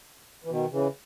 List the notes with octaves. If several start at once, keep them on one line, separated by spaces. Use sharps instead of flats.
E3
B2 D#3
C#3 E3